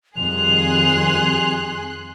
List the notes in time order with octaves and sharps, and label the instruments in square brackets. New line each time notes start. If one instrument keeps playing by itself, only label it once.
[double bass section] F2 D#3 G3 [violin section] G#4 C6 F#6 [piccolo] F7